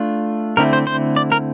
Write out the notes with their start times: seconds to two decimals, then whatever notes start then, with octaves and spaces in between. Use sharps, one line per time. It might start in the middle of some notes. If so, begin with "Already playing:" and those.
Already playing: A3 D4 F4
0.57 D3 A3 C4 E4 A#4
0.73 C5
0.87 C5
1.16 D5
1.32 A#4